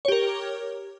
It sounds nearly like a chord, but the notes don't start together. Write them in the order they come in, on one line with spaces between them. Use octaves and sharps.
C#5 G4 A#4